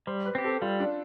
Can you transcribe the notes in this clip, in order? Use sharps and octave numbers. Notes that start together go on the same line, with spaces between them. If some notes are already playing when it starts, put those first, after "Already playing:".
G3 C5
B4
C4 G4
A4
G3 F4
D4